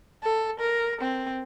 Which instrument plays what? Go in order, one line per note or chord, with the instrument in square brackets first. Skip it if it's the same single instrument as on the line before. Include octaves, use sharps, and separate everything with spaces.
[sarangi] A4
A#4
C4